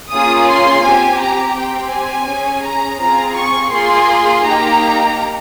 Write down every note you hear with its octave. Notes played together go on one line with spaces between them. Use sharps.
A#3 C#4 F4 G#4 D#6
C6
C4 G4 G#5
A#5
C4 G4 G5
G#5
C#4 G#4
A#5
C4 F4 G#4 A#5
C#6
A#3 F4 G#4 C6
A#3 D#4 G4 A#5